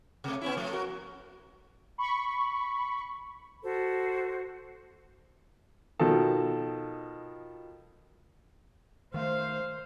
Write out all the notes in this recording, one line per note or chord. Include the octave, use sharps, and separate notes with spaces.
C3 A3
B3 C#4 E4
F3 A3
F#4 A#4
B5 C#6
F#4 A4 C5
B2 D#3 F3 A4
D#3 A3 C5 F5